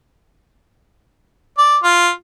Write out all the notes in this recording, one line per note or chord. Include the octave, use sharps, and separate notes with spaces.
D5
F4